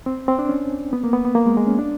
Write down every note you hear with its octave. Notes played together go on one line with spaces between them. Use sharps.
C4
C4
D4
C#4
B3
A#3
B3
B3
A#3
G#3
G#3
C#4
D4